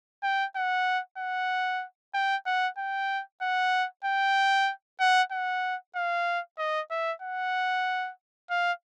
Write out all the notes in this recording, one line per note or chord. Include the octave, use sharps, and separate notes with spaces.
G5
F#5
F#5
G5
F#5
G5
F#5
G5
F#5
F#5
F5
D#5
E5
F#5
F5